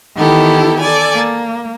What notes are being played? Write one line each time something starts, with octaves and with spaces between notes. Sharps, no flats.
D#3 E3 B3 E4 G4 A4
A4 D5 G#5
A#3